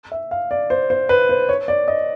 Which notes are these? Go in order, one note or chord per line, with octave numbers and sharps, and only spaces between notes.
E5
F5
D5
C5
C5
B4
C5
C#5
D5
D#5